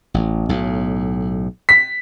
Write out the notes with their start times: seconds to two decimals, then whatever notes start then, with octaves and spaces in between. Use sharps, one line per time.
0.14 A1
0.49 B1 A2
1.69 B6